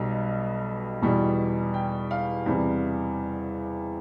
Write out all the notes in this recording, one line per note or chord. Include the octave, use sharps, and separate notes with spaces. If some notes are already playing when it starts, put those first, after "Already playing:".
Already playing: B1 B2 G3
E2 B2 G3
G5
F5
E2 C3 E3 G3